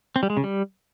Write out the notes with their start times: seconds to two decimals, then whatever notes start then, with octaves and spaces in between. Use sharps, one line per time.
0.16 C4
0.23 G3
0.30 G#3
0.37 C#3
0.44 G3